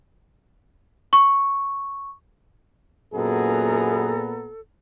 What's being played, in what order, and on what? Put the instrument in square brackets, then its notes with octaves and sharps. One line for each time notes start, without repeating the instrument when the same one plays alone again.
[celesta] C#6
[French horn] F#2 [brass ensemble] A#2 B3 A#5 [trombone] G#4 [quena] A4